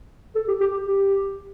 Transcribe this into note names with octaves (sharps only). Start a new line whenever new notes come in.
A4
G4
G4
G4